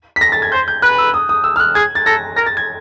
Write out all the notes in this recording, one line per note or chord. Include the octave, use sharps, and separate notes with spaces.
B6
A#6
A6
G#6
C5 G6
G6
B4 F#6
E6
D#6
D#6
E6
F6
F#6
G#4 G#6
A6
A4 A#6
A#4 A#6
A6
G#6